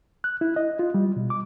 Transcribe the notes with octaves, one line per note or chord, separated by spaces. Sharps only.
F#6
E4
D#5
F4
G3
B2
D6